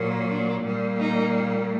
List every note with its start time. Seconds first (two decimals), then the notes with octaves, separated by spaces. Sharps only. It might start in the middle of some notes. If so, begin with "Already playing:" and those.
Already playing: A#2 F#3 A#3
0.30 D4
0.65 A#2 G3 A#3
0.99 D#4